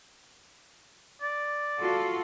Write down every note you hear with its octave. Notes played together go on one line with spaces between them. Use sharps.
D5
F4 F#4 A4